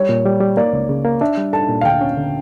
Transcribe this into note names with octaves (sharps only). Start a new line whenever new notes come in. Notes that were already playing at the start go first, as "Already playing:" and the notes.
Already playing: G3 C#5
A#2
G3
G3
A#3 D5
C#2
C#3
A#3
D4 E5
G3
A4 A5
A#2
F5
D2 G5
C#4
D3